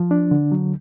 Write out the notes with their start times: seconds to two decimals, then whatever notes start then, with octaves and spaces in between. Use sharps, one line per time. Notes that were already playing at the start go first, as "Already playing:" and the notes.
Already playing: F3
0.11 D4
0.31 D3
0.52 F#3